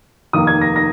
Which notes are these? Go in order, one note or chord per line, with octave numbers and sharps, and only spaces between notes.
F1 D#2 D#3 A#3 D#6
G#6
A#6
A#6